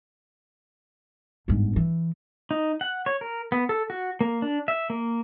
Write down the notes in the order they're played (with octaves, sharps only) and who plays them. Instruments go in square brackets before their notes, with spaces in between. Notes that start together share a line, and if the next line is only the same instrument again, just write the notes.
[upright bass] G1 G#2
E3
[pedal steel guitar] D#4
F#5
C#5
A#4
B3
A4
F#4
A#3
D4
E5
A#3